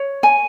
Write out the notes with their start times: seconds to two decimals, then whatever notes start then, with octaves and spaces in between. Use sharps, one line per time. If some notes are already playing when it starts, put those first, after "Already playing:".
Already playing: C#5
0.23 G#5